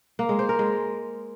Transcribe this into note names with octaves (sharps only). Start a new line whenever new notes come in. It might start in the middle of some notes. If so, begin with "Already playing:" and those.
A#3
G#3
C5
A#4
G#3